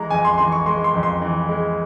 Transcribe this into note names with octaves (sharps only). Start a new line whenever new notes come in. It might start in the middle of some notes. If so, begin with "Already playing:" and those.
Already playing: E3 G#3 A#5
F2 G#5
C6
E3 C6
C#6
G#3 C6
C6
F2
C6
E3
G#3